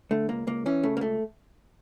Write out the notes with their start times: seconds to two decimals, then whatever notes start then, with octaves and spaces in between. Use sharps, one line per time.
0.11 D3 A3
0.29 C#2 A#3
0.47 C#2 A#3
0.66 E3 C#4
0.83 C#3 A3
0.97 A#3
1.01 C#2 A3